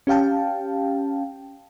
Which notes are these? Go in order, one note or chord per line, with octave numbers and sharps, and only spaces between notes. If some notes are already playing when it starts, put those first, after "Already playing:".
C#4 G4 F5 G5 A5